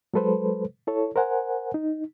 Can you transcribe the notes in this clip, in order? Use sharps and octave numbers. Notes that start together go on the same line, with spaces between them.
F#3 G#3 A4 B4 C5
E4 A4 C#5
A#4 C5 F#5 G#5
D#4